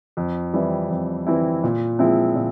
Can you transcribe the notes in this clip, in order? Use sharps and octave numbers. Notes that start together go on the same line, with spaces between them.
F2
E3 G3 C4 E4
F2
E3 G3 C4 E4
A#2
F3 G#3 C4 E4
A#2